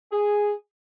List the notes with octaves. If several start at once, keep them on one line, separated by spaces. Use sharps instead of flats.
G#4